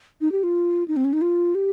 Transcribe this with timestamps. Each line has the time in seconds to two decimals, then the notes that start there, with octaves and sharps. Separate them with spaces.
0.21 D#4
0.32 G4
0.43 F4
0.88 D#4
0.96 C4
1.05 C#4
1.13 D#4
1.21 F4
1.55 G4